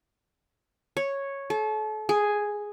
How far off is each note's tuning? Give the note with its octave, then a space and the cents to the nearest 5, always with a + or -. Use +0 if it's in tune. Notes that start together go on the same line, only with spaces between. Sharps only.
C#5 -5
A4 -35
G#4 +0